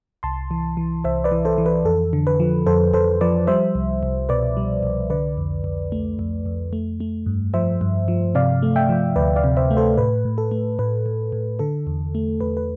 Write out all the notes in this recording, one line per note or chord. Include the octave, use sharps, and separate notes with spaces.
C2 A5 C6
E3
E3
C2 C5 E5
B4 D5
E3
A4 C5
E3
B4
F2 A4
D3
B4
F3
F2 A4 C5
F2 A4 C5
F3 B4 D5
G3 C5 E5
C2
C2
B2 B4 D5
G3
C2
D3 B4 D5
F2
F2
A3
F2
F2
A3
A3
G2
F3 C5 E5
G2
F3
C3 D5 F5
A3
E5 G5
F3
D2 B4 D5
D5 F5
C3
C5 E5
A3
A4 C5
A2 B4
A2
A4
A3
A2 B4
A2
A2
D3 A4
E2
A3
E2 B4
B4